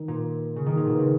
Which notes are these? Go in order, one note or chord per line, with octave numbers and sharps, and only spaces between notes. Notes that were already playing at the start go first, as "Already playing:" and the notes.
Already playing: D#3
A#2
C#3
D#3
A#2
B2
C#3